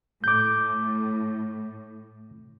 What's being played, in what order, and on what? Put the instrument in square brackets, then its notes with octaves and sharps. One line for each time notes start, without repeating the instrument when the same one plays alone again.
[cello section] A2 [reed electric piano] D6 G6